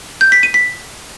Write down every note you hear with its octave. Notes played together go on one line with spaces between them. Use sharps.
G6
B6
D#7
B6